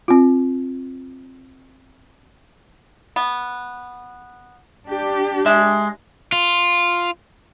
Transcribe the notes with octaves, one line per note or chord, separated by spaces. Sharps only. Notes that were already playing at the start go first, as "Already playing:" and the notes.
C4 F4
B3
D4 G4
G#3 E5
F4